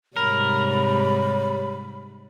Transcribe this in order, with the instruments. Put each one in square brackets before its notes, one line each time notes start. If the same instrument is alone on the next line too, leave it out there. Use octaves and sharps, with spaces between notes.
[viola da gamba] G#2 C3 G3 [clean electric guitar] A#4 [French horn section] C#5 [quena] B5